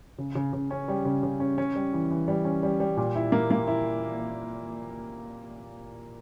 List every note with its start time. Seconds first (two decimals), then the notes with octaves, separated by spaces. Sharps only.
0.18 C#3
0.35 C#3
0.53 C#3
0.71 C#4
0.88 G3
1.05 C#3
1.23 C#3
1.40 C#4
1.58 C#4
1.76 G3
1.93 E3
2.11 E3
2.28 G3
2.45 C#4
2.63 G3
2.80 G3
2.97 A#2
3.15 E4
3.32 A#3
3.51 A#3
3.67 E4